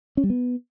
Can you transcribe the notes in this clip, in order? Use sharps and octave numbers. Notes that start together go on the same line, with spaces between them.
C#4
G3
B3